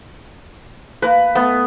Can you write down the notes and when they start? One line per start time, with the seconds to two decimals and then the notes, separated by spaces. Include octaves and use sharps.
1.02 A#3 B4
1.35 A3 B3